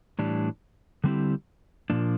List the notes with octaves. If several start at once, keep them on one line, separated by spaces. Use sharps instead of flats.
A2 E3 G3 D4
D3 G3 C4 E4 G4
A#2 F3 A#3 D4